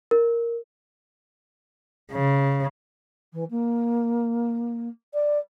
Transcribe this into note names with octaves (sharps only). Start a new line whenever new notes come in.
A#4
C#3
E3
A#3
D5